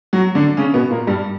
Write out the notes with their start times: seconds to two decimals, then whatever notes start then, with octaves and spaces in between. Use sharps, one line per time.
0.13 F#3 F#4
0.35 D3 D4
0.57 C#3 C#4
0.74 B2 B3
0.90 A#2 A#3
1.07 G2 G3